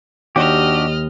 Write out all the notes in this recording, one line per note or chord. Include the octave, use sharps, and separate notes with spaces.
D#2 D4 F#4 G4 D#5 F6